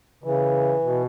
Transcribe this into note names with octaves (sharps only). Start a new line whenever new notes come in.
C#3 E3
B2